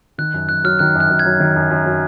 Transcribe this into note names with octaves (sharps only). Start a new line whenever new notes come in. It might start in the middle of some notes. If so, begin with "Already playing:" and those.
D#3 F#6
F#2
F#2 F#6
F#3 F6
D#3 F#6
F#2
F#6
F#2
G#6
F#3
D#3
F#2
F#2
F#3